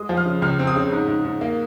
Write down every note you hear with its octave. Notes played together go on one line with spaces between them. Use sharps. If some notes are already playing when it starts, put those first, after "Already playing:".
Already playing: G#3 D#6
F3
F6
C#3
C#2 F6
C4
D#6
C#3
G#2
G#2
G#2
A#3